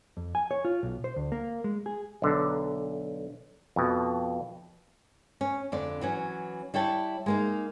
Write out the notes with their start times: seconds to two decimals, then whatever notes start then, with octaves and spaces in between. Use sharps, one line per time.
0.17 F2
0.35 G#5
0.51 C#5
0.65 F4
0.83 B1
1.04 C5
1.16 D2
1.32 A#3
1.64 G#3
1.86 G#4
2.22 B1 D3
3.76 F2 B2
5.41 C#4
5.72 F2 D3 D5
6.01 E3 F#3 C#4
6.74 G3 E4 C#5 G5 A5
7.26 G#3 A#3 D#4